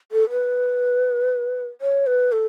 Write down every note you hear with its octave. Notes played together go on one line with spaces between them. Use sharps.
A4
B4
C#5
B4
A4